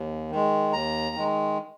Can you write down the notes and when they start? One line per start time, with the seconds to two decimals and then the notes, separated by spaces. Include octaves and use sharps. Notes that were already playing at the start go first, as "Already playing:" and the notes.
Already playing: D#2
0.31 D#3 G#3
0.73 D#2 A#5
1.16 D#3 G#3